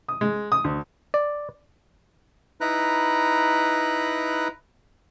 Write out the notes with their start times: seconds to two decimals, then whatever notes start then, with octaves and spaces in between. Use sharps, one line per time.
0.08 D#6
0.21 G#3
0.52 D#6
0.64 D2
1.14 D5
2.61 D#4 E4 B4 A#5 F#6